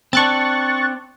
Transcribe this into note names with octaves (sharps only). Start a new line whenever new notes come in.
C4 D4 C#6 F#6 A6